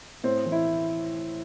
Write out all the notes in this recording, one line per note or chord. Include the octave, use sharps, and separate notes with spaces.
A2 C4
E3
E4